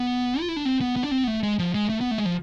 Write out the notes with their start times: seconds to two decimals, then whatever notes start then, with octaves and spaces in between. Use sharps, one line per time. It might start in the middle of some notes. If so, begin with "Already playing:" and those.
Already playing: B3
0.41 F4
0.49 E4
0.56 D4
0.65 C4
0.81 B3
0.96 B3
1.04 D4
1.11 C4
1.24 B3
1.27 A3
1.43 G#3
1.59 F3
1.74 G#3
1.89 A3
2.01 B3
2.11 A3
2.18 G#3
2.26 F3